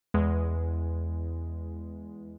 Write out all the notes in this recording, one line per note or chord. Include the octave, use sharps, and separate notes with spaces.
E2 G#3